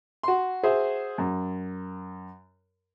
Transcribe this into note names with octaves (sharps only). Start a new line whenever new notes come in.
F#4 C6
F#4 G#4 C5 E5
F#2